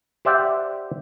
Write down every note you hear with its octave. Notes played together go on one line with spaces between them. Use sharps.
G4 C5 D5 E5 F#5 G5